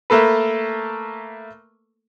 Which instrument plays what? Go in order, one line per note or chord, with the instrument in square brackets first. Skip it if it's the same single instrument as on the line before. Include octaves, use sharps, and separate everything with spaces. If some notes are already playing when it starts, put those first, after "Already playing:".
[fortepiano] A3 A#3 A4 B4